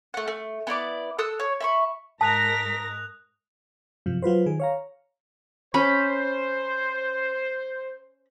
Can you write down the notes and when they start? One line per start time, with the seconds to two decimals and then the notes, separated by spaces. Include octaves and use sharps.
0.14 A3 F#5
0.27 A3
0.67 B3 E4 D5 D6
1.19 A4 D#6 E6 F#6
1.40 C#5
1.61 E5 B5 C#6
2.21 G#2 A#4 A5 D#6 F#6 A#6 B6 F7
4.06 F#2 C3 F3
4.22 F#3 F4 B4 C5
4.46 D#3 G#4
4.60 C#5 F5 A#5
5.74 C#4 C5 B5